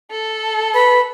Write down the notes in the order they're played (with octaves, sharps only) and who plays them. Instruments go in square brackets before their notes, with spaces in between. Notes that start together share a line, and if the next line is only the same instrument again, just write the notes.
[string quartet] A4
[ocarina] B4 [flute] B5